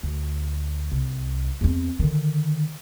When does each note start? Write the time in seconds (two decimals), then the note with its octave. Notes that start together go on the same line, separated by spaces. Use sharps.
0.03 D2
0.91 C2
1.61 E2 C4
1.99 D3 D#3